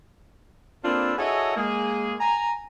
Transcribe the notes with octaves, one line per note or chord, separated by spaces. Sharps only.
A#3 C4 D4 F4 A4 B4
E4 F#4 G#4 A4 C#5 D#5
G#3 A#3 G#4
G#5 A#5